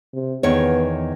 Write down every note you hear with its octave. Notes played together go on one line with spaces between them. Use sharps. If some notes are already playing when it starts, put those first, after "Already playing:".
C3
E2 D#3 B3 C#5